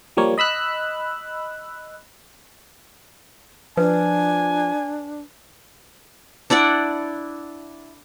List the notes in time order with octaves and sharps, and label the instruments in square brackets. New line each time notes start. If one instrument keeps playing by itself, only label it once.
[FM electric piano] F3 G3 A#3 C#5
D#5 B5 E6 F#6
[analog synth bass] F3 [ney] D4 [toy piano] B4 [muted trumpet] G#5
[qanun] D4 E4 D5 F#5